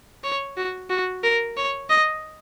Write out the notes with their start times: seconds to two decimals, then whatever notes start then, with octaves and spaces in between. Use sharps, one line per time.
0.24 C#5
0.57 F#4
0.90 F#4
1.24 A#4
1.57 C#5
1.90 D#5